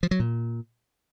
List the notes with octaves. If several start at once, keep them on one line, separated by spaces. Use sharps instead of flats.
F3
F#3
A#2